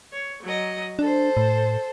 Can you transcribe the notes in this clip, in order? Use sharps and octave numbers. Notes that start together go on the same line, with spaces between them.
C#5
F#3 D#5
D4 A4 C5
A2